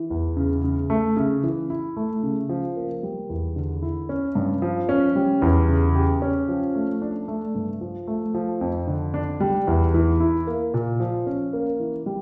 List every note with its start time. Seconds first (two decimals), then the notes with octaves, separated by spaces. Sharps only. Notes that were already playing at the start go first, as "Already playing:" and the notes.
Already playing: E3
0.10 E2
0.37 C#3
0.64 C#3
0.90 A3
1.17 C#3
1.43 E3
1.70 E4
1.97 A3
2.23 C#3
2.49 F3
2.76 A#3
3.03 G3
3.30 E2
3.56 D3
3.82 E4
4.09 C#4
4.35 G2
4.62 F3
4.89 C#4
5.15 G3
5.42 E2
5.69 C#3
5.95 G4
6.22 C#4
6.48 F3
6.75 A3
7.01 D4
7.28 A3
7.55 G2
7.81 F3
8.07 A3
8.34 F3
8.61 F2
8.87 D3
9.14 D4
9.40 G3
9.67 E2
9.94 E3
10.20 E4
10.47 A#3
10.74 A#2
11.00 F3
11.27 C#4
11.53 A#3
11.80 E3
12.06 G3